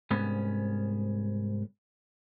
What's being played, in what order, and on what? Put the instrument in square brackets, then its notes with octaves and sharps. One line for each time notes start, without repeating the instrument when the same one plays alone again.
[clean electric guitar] C2 G#2 B3 C#4